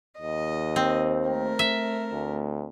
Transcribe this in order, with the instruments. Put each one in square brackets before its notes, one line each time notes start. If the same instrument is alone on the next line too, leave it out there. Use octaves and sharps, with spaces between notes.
[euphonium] D#2 [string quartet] D#5
[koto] C4
[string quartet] A3 A#4
[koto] E5
[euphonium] D2